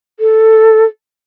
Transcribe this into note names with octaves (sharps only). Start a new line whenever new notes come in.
A4